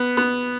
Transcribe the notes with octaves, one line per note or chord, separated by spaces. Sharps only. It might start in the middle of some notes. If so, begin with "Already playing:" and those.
Already playing: B3
B3